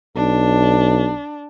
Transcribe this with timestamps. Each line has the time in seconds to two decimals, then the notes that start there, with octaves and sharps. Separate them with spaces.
0.16 B1 D4